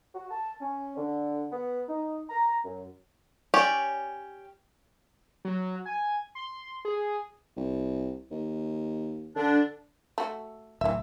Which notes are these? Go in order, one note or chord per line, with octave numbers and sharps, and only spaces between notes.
F#4
A5
C#4
D3
B3
D#4
A#5
F#2
C#4 G4 C#5 D5
F#3
G#5
C6
G#4
C2
D#2
D3 D4
A3 F#4
D1 E3 E5